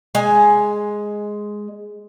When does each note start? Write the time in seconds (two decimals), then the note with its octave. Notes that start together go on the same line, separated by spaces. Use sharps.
0.15 G#3 G#5